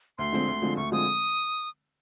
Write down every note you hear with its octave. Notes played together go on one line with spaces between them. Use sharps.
D2 C6
D3 F3 G#3 C4
D2
D3 F3 G#3 C4
D2 C#6
D3 F3 G#3 C4 D#6